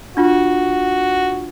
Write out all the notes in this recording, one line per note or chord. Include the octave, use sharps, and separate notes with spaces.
D4 F4 F#4